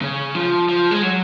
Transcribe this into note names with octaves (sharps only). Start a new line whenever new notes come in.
C#3
F3
F3
G#3
F#3